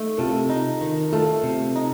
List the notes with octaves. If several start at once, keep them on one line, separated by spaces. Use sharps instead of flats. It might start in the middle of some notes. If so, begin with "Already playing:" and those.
Already playing: A3 D#4
C3 F4 A4
D#4
D#3
A3 F4 A4
C3
D#4